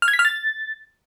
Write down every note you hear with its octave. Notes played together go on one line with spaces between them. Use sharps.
F6
G#6
B6
F6
A6